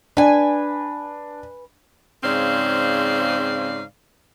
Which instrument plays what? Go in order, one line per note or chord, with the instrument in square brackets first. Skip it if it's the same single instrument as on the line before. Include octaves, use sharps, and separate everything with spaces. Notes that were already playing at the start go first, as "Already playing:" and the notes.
[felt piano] D4 [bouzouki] B4 G#5
[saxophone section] G#2 C#3 C4 D5 F5